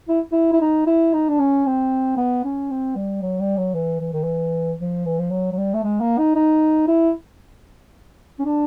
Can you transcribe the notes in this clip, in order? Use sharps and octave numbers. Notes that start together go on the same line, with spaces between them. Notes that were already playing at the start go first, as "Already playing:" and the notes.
E4
E4
E4
D#4
E4
D#4
D4
C#4
C4
B3
C#4
C4
G3
F#3
G3
F#3
E3
E3
D#3
E3
F3
E3
F3
F#3
F#3
G3
A3
G#3
A#3
D#4
D#4
E4
C#4
D4